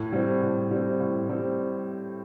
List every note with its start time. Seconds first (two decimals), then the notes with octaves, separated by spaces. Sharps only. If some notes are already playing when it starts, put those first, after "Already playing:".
Already playing: A2
0.12 G3 C4
0.42 A2
0.71 G3 C4
1.00 A2
1.29 G3 C4